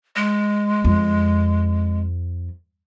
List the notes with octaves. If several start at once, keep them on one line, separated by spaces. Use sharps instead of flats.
G#3
F2